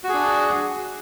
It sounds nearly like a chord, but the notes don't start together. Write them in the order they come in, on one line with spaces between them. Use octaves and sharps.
F#4 G#4 D4